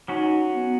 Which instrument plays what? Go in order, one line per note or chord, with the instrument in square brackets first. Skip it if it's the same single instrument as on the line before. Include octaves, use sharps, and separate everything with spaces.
[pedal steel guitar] F#3 C#4 F#4 [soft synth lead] D#4
[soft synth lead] B3